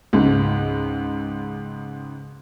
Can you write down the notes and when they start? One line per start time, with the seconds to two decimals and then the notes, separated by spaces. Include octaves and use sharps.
0.13 C#2 G#2